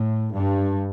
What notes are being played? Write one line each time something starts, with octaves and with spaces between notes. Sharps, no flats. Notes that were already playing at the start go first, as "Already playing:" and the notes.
Already playing: A2
G2